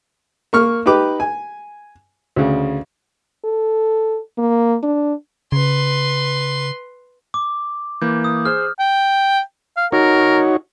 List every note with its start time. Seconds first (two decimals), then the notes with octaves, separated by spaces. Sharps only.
0.53 A#3 C#6 F6
0.86 D#4 G4 B4 D6
1.20 G#5
2.36 D2 C#3
3.45 A4
4.38 A#3
4.83 D4
5.52 C#3 B4 C6
7.34 D6
8.02 E3 A#3 G6
8.24 D#6
8.45 G#4 C5 F6
8.79 G5
9.77 F5
9.92 D#4 F#4 A#4 C#5